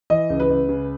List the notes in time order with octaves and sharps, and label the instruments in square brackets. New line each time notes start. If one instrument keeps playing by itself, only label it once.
[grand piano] E3 D#5
C#2
B4
C#2
C#3